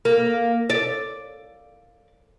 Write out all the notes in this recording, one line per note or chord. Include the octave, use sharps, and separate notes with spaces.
A#3
D5